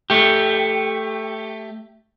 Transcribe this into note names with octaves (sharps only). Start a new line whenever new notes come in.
A3 G4